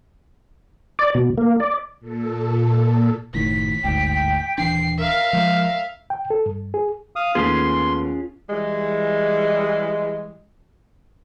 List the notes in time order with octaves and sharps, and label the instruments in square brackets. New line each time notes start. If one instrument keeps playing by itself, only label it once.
[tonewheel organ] D5
B2
A#3
D5
[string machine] A#2 A4
[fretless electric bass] F#1 A2 D#3 [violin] B6
[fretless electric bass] G1 D2 G#2 [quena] G5
[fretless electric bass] D#1 E3 D4 [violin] C7
[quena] A#4 [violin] E5 F5
[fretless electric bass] F3 G#3 [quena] A#4
[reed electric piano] G5
A4
G2
G#4
[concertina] F5 D#6
[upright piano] D#2 A3 B3 [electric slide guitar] C#4 F4 G#4 [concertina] C6
[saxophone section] E3 G3 G#3